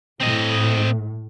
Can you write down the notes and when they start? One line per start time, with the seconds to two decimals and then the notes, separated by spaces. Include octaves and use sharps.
0.20 A2 C4 D#5